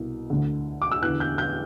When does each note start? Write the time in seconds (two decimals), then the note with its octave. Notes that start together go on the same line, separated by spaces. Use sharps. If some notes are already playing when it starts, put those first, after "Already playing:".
Already playing: C2 B2
0.30 D2 D3
0.82 D6
0.92 E6
1.02 E2 D3 F#6
1.20 G6
1.38 G6